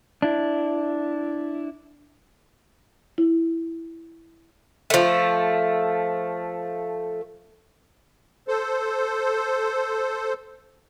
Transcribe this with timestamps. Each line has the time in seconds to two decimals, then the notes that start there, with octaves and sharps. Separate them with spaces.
0.22 D4 E4
3.18 E4
4.90 F3 A3
8.48 A4 C5